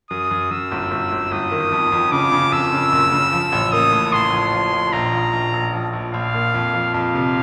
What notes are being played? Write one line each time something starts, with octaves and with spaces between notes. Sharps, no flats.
F#2 D#6
F#2
F#2 E6
G1
G1
G1
G1 D#6
D#3
F2
F2
C#3 D6
C#3
F2 E6
C#3
F#1
C#3
F3
A1
A#3 D#6
A2
A2 C6
F3
F3
F3
A#1 A#5
F3
A#1
A#1
F3
A#1
A#1 F5
A#2
F2
F3
F2 F5
C3